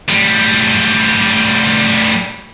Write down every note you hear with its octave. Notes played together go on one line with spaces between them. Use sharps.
A2 G3